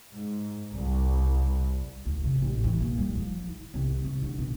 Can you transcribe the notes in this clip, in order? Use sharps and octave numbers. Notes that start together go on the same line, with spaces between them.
G#2
C2
D2
C3
A1
E3
A#2
G3
F3
E4
C2
C2
D3
B2